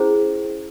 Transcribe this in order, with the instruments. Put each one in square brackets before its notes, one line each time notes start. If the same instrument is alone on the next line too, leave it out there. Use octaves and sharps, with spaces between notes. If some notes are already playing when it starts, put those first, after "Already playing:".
Already playing: [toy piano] C#4 E4 G#4 C5